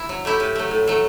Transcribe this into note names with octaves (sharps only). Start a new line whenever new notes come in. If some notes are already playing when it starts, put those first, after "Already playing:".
Already playing: E4
F#3
A3 E4 G4
A2
F#3 A3
A2
F#3 A3